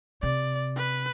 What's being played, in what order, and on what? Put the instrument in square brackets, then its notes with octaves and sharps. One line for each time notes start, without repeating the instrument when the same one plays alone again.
[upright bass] C3 [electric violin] D5
[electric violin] B4